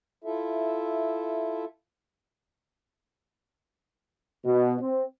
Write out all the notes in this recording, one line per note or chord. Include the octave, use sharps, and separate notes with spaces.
E4 F4 A4 E5
B2
C4